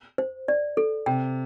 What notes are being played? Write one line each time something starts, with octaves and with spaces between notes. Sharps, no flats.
C5
D5
A4
C3 G5